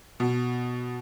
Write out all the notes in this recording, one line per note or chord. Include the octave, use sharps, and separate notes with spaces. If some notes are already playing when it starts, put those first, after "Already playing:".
B2